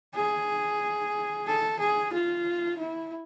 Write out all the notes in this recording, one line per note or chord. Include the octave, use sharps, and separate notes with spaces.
G#4
A4
G#4
F4
E4